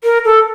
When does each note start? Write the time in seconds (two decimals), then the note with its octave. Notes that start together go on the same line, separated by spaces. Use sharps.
0.04 A#4
0.25 A4